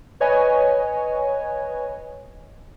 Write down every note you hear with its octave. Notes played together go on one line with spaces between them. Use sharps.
B4 C#5 D#5 G#5